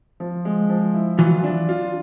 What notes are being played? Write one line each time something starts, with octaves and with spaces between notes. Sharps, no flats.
F3
G#3
F3
E4
E3 F#3 F4
D4
F4